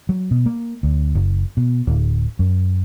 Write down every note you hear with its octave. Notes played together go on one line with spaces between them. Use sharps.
F#3
B2
A#3
D2
F#1
B2
D1
F#2